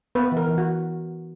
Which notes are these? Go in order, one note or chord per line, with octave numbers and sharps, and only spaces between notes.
B3 B4
E3
A#4
E3
F#4